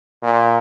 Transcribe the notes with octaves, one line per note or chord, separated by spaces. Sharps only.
A#2